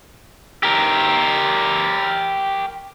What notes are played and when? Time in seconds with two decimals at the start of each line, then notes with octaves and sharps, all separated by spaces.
0.63 G4 A#4